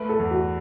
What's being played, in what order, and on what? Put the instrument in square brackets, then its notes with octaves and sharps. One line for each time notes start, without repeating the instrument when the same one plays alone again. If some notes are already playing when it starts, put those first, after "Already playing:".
Already playing: [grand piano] A3 [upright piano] B4
[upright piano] A4
[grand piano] E2
[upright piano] F#4